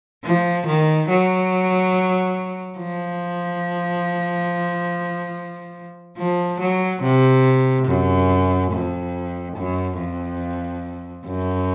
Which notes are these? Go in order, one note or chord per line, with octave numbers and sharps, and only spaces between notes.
F3
D#3
F#3
F3
F3
F#3
C3
F#2
F2
F#2
F2
F#2